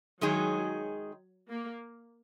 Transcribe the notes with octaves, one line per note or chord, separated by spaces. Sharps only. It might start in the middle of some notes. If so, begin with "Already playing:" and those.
D#3 F#3 G#3 D#4 G#4
A#3